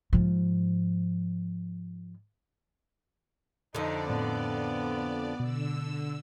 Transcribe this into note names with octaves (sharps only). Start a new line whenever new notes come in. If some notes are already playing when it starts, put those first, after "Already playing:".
G#2 F3
F2 D3 D#4 D5
A2 B3 C4
B2 D3 E6